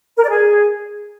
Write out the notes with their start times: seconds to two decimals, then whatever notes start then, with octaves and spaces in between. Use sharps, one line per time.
0.18 A#4
0.23 D5
0.29 G#4